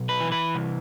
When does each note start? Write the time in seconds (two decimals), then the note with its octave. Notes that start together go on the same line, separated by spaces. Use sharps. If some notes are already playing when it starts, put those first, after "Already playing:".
Already playing: B1
0.09 B4
0.20 E3
0.32 B4
0.55 C2